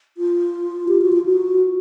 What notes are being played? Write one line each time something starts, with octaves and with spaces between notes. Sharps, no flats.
F4
G4
F#4
F4
F#4